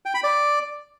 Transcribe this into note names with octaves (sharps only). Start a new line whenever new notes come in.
G5
B5
D5